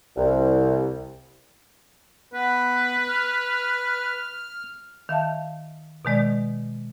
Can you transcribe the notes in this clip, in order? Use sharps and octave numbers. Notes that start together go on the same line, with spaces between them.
C2
B3 B4
F6
D#3 E5 F5 A5
B2 D#3 G#3 D5